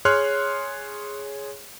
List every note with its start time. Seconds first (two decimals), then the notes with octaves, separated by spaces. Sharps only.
0.05 G#4 C#5 C6 F6 F#6